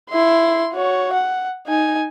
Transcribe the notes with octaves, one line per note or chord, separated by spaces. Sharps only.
E4 C6
F#4 C#5
F#5
D#4 G#5